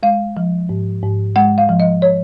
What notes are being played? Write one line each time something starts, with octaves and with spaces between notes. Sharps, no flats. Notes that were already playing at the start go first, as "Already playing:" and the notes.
G#3 F5
F3
G#2
G#2
G#3 F#5
F5
F3
D#5
C#5